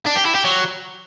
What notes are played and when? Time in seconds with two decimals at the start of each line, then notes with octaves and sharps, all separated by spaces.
0.06 D4
0.15 G4
0.25 E4
0.35 G4
0.44 F#3